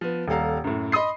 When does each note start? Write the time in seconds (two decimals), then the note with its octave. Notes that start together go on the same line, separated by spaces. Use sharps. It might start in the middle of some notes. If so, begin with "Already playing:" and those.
0.01 F3 B3
0.28 D#1 G3 A4 F5 A#5
0.64 F#2 A2
0.92 D#5 B5 C6 D#6 C7